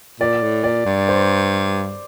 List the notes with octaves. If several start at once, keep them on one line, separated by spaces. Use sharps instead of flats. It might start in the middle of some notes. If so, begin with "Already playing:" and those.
A#2 D5
A2
A#2 D5
G2
C5